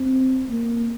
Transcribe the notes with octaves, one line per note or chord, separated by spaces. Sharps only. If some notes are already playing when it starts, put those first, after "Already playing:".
Already playing: C4
A#3